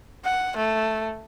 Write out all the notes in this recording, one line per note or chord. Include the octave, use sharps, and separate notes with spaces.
F#5
A3